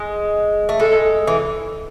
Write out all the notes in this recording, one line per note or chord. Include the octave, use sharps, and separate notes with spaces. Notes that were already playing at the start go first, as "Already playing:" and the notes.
Already playing: G#3
A3
G#3 A4
E3